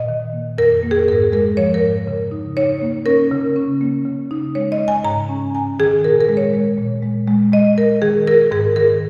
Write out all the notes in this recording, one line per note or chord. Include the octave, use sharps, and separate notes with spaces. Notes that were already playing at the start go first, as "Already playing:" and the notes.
Already playing: A#2 D#5
D#3
A#3
F2 A#4
A#3
G#4
G#2 A#4
G#3 A#4
F3 C#5
A#4
G#2
C#3
D#4
D#4 C#5
A#3
C#4 A#4
C#3
C#4
A#3
C#3
D#4
G#3 C#5
D#5
C#3
G#5
G#2 A#5
C#4
G#2 G#5
D#3 G#4
A#2 A#4
A#4
G#3
C#5
G#3
A#2
G#3
G#3
G#3 D#5
G#3 A#4
D#3 G#4
D#3 A#4
G#2 G#4
D#3 A#4